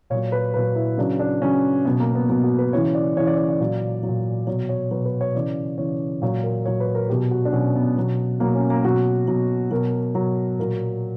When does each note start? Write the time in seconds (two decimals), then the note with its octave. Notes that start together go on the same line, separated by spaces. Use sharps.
0.10 A#2 C#5
0.15 F#3
0.32 B4
0.54 A#2 F#3 B4
0.76 E4
0.98 C#3 F#3 D4
1.19 D4
1.41 C#3 F#3 C#4
1.85 B2 F#3 B3
2.00 A#3
2.15 B3
2.29 B2 F#3 B3
2.44 F#4
2.58 B4
2.73 C#3 E3 C#5
2.95 D5
3.16 C#3 E3 C#5
3.27 D5
3.38 C#5
3.49 D5
3.60 A#2 F#3
4.03 A#2 F#3
4.47 B2 F#3 C#5
4.69 C#5
4.91 B2 F#3 B4
5.05 B4
5.21 C#5
5.35 C#3 E3 D5
5.78 C#3 E3 C#5
6.22 A#2 F#3 C#5
6.43 A#4
6.65 A#2 F#3 C#5
6.80 B4
6.95 A#4
7.09 B2 F#3 G4
7.31 F#4
7.45 D4
7.52 B2 F#3 C#4
7.75 B3
7.97 B2 F#3
8.40 B2 F#3 A#3
8.55 C#4
8.70 A#3
8.84 B2 F#3 F#4
9.28 B2 F#3
9.71 B2 F#3 A#4
10.15 B2 F#3
10.59 A#2 F#3 A#4